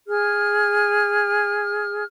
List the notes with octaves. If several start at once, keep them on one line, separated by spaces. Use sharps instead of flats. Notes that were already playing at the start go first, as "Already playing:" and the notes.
G#4 F6